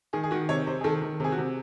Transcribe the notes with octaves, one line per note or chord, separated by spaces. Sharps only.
D#3 G#4
G#4
D#3 F#4
C3 C#5
C3 C5
G#4
D#3 A4
D#3
C3 G#4
F#4
C3